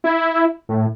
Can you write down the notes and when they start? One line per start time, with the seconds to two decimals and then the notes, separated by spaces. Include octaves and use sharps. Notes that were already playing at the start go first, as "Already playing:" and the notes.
0.04 E4
0.69 A2